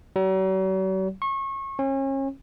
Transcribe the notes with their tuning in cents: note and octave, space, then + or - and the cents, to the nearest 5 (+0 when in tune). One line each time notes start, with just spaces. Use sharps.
F#3 +45
C#6 -30
C#4 -35